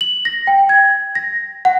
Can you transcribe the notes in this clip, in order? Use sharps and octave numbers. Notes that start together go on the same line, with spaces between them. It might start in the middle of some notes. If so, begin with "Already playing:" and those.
F#7
A#6
G5
G#6
A#6
F#5